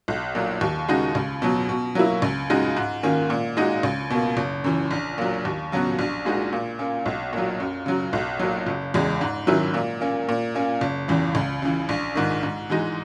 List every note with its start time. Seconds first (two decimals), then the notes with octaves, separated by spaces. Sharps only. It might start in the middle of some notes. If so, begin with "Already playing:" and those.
0.08 B1
0.35 A#2 F#3
0.61 D#2
0.88 C#3 G#3 D#4 F#4
1.15 C#2
1.42 B2 F#3
1.69 B2
1.95 F#3 A#3 E4
2.22 C#2
2.50 C#3 G#3 D#4 F#4
2.76 G#2
3.03 D#3 A#3 C#4
3.30 A#2
3.57 G#3 D#4 F#4
3.83 C#2
4.10 B2 A#3
4.37 F#1
4.64 F#2 E3
4.91 A#1
5.18 A#2 F#3
5.45 D#2
5.72 C#3 F#3 B3 F#4
5.99 A#1
6.25 A#2 G#3 D#4 F#4
6.53 A#2
6.79 A#3 C#4
7.06 B1
7.33 A#2 F#3
7.60 F#2
7.86 C#3 F#3
8.13 B1
8.39 A#2 F#3
8.67 F#1
8.94 E2 C#3 G#3
9.21 G#2
9.47 D#3 F#3 C#4 E4
9.74 A#2
10.01 A#3 C#4
10.29 A#2
10.55 A#3 C#4
10.81 F#1
11.08 E2 C#3 E3
11.35 C#2
11.62 C#3 E3
11.89 A#1
12.15 G#2 D#3
12.43 G#2
12.70 E3 G#3 D#4